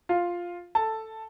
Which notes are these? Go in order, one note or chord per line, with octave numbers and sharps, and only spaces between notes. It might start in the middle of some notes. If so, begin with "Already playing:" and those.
F4 F5
A4 A5